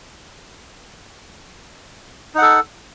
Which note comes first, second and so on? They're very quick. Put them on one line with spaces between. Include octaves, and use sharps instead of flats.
D#4 F#5 A4